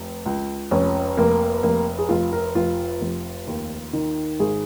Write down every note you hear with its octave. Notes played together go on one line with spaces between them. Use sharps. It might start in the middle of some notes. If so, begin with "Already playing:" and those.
Already playing: F1
C#2
F1 C#4
F1 A#3
F1 A#3
G#4
F1 F4
A#4
F1 F4
F1
D#2
D#3
G#1 G#4